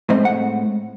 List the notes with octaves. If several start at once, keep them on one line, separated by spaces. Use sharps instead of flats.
A2 G#3 C4 D#5
F#5